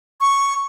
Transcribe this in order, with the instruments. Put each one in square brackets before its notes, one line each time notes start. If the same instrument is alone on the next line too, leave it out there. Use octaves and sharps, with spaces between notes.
[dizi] C#6